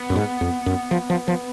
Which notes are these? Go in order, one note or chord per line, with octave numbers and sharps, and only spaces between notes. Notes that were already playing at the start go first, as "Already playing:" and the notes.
Already playing: B3
F#2
G#2
F2
F#2
F3
F3
F3